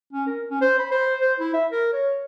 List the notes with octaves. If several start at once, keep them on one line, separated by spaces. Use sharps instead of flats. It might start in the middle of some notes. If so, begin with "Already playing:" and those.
C#4
A#4
C#4
C5
B5
C5
C5
E4
E5
A#4
C#5